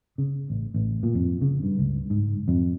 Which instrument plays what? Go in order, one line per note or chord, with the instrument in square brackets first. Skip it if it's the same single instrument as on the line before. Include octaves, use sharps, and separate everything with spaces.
[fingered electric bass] C#3
A1
A1
A#2
F2
C#3
G2
C#2
G#2
F2